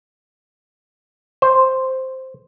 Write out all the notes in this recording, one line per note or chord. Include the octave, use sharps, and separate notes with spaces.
C5